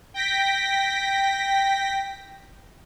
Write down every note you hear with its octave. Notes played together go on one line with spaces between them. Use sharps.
G5 A#6 B6